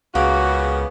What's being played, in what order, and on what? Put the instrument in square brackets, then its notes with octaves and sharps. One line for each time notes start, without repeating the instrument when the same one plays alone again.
[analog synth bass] C#2 [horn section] C#3 B3 [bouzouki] A#3 [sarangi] F#4